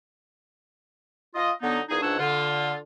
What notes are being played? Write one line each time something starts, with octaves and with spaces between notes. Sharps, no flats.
F4 D#5
D3 F#3 B3 D#4
E2 A#2 D#4 G#4
C#2 G#2 D4 C#5 F#5 E6
D3 F4